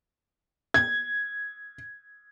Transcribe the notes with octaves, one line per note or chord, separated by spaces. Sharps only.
G#6